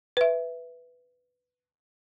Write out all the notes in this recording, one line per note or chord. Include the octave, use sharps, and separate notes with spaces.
B4 E5